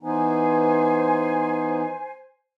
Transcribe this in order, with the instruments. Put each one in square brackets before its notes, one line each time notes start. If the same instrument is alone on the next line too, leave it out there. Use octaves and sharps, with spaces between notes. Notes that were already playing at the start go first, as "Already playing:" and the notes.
[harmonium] E3 B3 D#4 [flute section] C5 G#5